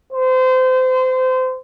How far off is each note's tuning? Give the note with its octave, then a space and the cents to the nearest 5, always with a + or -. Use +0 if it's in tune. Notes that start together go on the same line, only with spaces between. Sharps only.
C5 -25